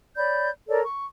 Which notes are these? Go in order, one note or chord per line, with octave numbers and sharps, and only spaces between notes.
C#5 D5 B5 G6
A4 A#4 C#5 D5
C#6